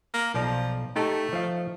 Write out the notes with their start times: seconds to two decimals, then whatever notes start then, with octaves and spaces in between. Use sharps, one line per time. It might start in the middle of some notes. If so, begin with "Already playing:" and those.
0.14 A#3
0.34 B1 F3 D5
0.96 A3 D#4 G4 A4
1.33 F3 D#5 F5